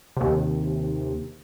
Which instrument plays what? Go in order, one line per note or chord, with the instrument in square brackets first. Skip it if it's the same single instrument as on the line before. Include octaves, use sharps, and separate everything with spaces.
[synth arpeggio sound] D#2 C3